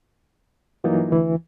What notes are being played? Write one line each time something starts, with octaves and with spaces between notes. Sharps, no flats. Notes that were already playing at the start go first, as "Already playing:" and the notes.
G2 E3 F#3 A#3 D#4 F4
D2 E3